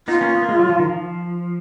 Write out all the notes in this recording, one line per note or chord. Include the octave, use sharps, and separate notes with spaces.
B3 D#4 F4
A#3 C#4
B3
A#3
G#3
F#3
F3
D#3
F3